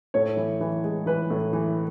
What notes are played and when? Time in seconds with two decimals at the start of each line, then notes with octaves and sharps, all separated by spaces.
0.14 A2 C#5
0.37 E3
0.61 E3
0.84 G#3
1.06 E3 B4
1.30 A2
1.53 E3